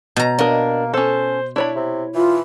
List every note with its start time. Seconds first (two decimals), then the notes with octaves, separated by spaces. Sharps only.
0.16 B2 A#5
0.39 A#3 D4 A#4 D#5
0.94 C#4 A4 C5
1.56 D4 E4 C#5 B5
1.76 C3
2.15 E3 F4